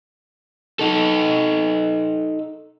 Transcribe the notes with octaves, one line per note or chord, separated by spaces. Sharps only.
D#4 A4